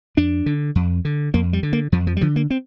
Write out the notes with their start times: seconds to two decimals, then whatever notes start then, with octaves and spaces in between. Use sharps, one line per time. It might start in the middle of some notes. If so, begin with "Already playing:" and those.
0.17 F2 D4
0.46 D3
0.75 F2
1.05 D3
1.34 F2 A#3
1.53 G3
1.63 D3
1.73 A#3
1.92 F2 F3
2.07 F3
2.17 G3
2.21 D3 F3
2.36 A#3
2.50 C4